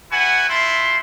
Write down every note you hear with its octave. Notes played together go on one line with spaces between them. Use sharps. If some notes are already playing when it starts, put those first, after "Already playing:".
E4 F#4 B4 F#5 G#5
A3 E4 F4 C6